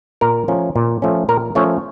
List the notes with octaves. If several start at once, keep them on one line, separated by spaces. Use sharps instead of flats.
A#2 A#4
F3 A3 C#4
A#2
F3 A3 C#4
A#2 A#4
F3 A3 C#4 C#5